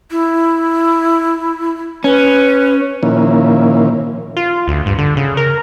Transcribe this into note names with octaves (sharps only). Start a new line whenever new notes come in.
E4
C#4 B4
A#2 D#3 F3 A#3 C#4 E4
F4
D2
G2
D3
C#3
A#4